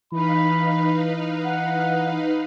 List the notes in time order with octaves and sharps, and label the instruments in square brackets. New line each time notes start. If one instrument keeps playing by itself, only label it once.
[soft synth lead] E3 [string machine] D#4 B4 F5 [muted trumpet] B5
[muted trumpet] F#5